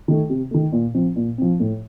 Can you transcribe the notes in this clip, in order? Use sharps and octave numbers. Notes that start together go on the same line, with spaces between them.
D#3 A3
C3
D#3 A3
A#2
F3 C4
A#2
F3 C4
A2